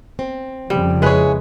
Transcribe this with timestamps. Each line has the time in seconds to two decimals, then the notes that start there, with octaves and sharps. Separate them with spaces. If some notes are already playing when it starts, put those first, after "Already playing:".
0.19 C4
0.70 F2 C#3 F3 G3
1.02 G#3 E4 G#4 B4 C#5